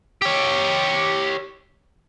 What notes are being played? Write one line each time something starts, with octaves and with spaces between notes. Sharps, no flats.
G4 C#5